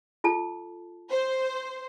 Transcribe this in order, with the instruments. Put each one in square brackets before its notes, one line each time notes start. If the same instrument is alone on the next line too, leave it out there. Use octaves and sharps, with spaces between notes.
[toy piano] F4 A4 A5
[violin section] C5